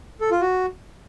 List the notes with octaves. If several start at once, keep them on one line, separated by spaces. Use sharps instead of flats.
A4
F4
F#4